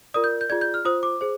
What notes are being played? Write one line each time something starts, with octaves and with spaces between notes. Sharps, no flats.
F4 A#4 D5 D#6
G6
G6
F4 G#4 D5 G#6
G6
F6
F4 C5 D#6
D6
G#4 C5